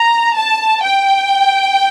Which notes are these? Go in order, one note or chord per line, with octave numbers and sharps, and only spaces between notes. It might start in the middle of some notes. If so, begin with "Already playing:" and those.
Already playing: A#5
A5
G5